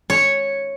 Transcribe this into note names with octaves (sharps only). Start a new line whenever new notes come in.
C#5